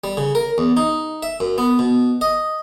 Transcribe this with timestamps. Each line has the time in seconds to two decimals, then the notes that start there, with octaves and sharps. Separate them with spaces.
0.04 G3
0.17 C#3
0.35 A#4
0.58 E2
0.77 D#4
1.23 E5
1.40 F#2
1.58 B3
1.79 B2
2.21 D#5